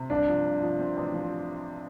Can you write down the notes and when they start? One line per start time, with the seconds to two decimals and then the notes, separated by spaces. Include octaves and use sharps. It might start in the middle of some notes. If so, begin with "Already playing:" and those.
Already playing: C3
0.10 G2 D4
0.28 F3
0.45 G2
0.62 F3
0.79 C4
0.97 A1
1.14 F3